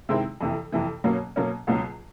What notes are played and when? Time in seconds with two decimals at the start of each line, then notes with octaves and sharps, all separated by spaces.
0.09 C3 D#3 G#3 C4 E4
0.41 F2 C3 E3
0.72 F2 C3 E3
1.04 B2 F#3 A#3 C#4
1.36 B2 F#3 A#3 C#4
1.67 C#2 B2 F#3